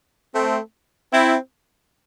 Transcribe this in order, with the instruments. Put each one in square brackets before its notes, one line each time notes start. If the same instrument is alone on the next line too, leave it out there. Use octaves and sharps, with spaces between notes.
[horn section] A3 C4
C4 E4